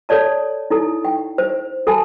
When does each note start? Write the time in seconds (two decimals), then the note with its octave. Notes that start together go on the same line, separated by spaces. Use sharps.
0.09 A4 C#5 D5 A5
0.70 D#4 E4 A4
1.05 G5
1.38 C5
1.87 A4 G#5 A5 B5